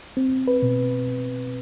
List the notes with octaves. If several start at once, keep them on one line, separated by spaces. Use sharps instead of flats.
C4
B4
B2